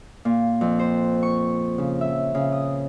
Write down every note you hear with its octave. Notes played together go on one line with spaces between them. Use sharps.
A#2
F2
C5
C#6
C#3
E5
C#3
D#6